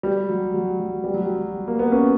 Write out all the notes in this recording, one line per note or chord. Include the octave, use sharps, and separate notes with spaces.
G3
F#3
F#3
F#3
G3
F#3
G3
A#3
B3
C#4